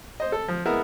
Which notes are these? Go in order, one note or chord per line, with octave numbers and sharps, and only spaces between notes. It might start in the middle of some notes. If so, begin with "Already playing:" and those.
C5 D#5
A4
F3
G#3 B3 E4 A#4